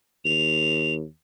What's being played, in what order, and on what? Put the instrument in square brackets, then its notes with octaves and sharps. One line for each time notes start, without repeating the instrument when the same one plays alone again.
[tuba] D#2 [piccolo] F7